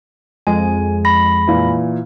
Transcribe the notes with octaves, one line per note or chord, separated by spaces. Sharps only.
F2 G#3 G#5
B5 A#6
A#2 E3